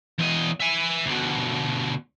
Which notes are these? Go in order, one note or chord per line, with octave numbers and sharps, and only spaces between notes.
E2 D#5
E5 G#5
D2 B2